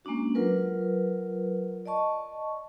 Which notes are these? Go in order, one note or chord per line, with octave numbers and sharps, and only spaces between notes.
G#3 A#3 C#4 D4 F#4
F#3 F4 A#4 B4
D5 D#5 A5 C#6